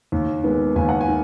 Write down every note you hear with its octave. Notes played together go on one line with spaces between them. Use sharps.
D#2
D#3 G#3 B3
D#2 G#5
F#5
G#5
D#3